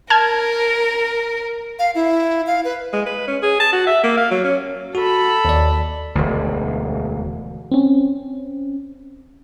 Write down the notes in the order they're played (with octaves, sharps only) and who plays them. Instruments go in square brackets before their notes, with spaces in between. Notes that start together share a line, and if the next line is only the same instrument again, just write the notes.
[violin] A#4 [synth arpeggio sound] A5 F6 G#6
[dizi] F5
E4
F5
B4
[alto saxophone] G#3
B4
C#4
G#4
A5
F#4
E5
A#3
F5
F#3
C#4
[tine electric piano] F#4 [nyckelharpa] A4 B5
[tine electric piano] D#2 D5
[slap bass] E1 D2
[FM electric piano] C4 C#4